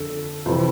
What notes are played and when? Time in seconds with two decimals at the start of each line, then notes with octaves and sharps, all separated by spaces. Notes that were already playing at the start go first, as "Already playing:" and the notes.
Already playing: F2 D3 A4
0.46 F2 C3 E3 C5